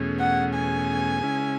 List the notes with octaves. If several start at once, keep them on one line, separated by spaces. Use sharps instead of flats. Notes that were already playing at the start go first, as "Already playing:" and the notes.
Already playing: E2 B2 A3 C#4 G#4
F#5
G#5
C#3 G#3 C#4 E4